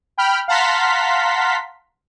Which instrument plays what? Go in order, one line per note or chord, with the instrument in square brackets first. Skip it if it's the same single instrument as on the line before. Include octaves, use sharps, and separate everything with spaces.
[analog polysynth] G5 B5 F6
F5 F#5 A5 A#5 C6 B6